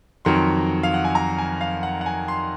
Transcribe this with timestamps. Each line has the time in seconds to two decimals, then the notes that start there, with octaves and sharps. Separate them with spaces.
0.25 F2 D#3 F#3 C6
0.83 F5
0.94 F#5
1.04 G#5
1.15 A#5
1.38 G#5
1.61 F5
1.83 F#5
2.01 F#5
2.06 G#5
2.28 C6